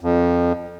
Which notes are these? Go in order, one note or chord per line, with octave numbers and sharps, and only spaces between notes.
F2